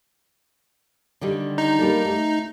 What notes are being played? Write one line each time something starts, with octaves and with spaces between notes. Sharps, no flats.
D3 D#3 G3
D#4
G3 A#3 A4
A3